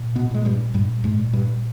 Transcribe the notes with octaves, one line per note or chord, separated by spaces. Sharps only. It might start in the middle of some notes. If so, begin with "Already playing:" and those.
Already playing: A#2
B2 B3
A#2 G#3
G2 G3
G2 A#2 G3
G#2 G#3
A#2
G2 G3